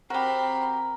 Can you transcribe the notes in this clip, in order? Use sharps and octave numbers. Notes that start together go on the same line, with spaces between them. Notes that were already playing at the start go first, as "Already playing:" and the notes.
C4 F#4 G4 A#4 B5